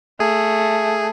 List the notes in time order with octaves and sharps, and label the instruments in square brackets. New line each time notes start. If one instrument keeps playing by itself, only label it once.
[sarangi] A3 [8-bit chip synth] G#4